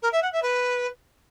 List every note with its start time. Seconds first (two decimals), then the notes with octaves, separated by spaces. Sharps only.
0.02 A#4
0.12 E5
0.22 F#5
0.32 E5
0.42 B4